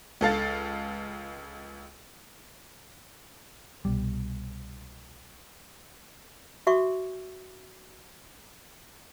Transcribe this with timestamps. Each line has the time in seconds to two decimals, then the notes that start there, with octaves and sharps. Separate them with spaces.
0.21 C#2 A4 F5 A6
3.85 C2 B2 G3
6.67 F#4 E5 C#6 D6